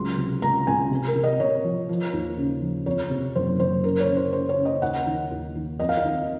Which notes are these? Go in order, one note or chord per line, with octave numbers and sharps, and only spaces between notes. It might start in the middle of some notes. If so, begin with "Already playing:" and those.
Already playing: C#2 F#3 C6
C3
C#2 A#5
C#2 G#5
C3
A#4
C3
D#5
C3 C#5
F3
F3
D#2
C#3
F3
F2 C#5
C3
F#1 C5
F#1 C5
C#3 A#4
C#5
C#3
C5
C#3 C5
C#5
C#3
D#5
D#2 F#5
D#3
D#2
D#3
F2 D#5
F5
D#5
D#3